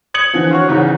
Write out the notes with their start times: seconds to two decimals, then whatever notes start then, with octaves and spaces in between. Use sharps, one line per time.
0.14 D#6 G#6 C#7 F#7
0.33 D3 E3 F3
0.51 F4 F#4 C#5
0.68 G#1 G#2 C#3 E3